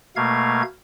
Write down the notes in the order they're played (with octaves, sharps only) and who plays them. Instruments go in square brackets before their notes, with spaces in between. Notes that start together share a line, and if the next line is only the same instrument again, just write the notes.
[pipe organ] B2 A3 A#3 F5 G#6